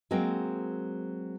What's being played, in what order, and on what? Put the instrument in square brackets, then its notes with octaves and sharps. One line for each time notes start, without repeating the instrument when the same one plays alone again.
[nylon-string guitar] F#3 G#3 A#3 C4